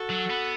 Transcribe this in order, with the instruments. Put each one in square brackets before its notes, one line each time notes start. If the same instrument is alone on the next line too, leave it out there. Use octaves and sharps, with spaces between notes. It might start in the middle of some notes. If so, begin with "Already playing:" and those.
Already playing: [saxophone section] F#4 A4
[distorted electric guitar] F#3
B3